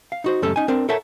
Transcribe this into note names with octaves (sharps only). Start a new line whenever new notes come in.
F5
D#4 F#4 C5
C#2 F#2 A3 C#4 G4 A4
C#4 D#4 G#5
C4 D4 A#4 C5
A4 A#4 C#5 E5 F#5 A5